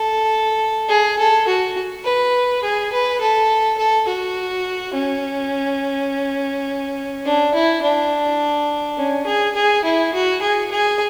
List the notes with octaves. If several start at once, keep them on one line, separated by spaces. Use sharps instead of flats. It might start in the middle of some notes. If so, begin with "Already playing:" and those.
Already playing: A4
G#4
A4
F#4
B4
G#4
B4
A4
A4
F#4
C#4
D4
E4
D4
C#4
G#4
G#4
E4
F#4
G#4
G#4